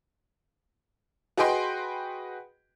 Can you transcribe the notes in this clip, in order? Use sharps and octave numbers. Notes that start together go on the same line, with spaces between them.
F#4 G#4 B4 D#5 G5 C6